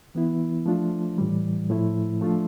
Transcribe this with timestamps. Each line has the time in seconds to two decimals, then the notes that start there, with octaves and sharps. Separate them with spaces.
0.15 E3 B3 E4
0.66 F3 A3 D4 F4
1.18 A2 E3 G3
1.70 A2 F3 A3 E4
2.21 F3 A3 D4 F4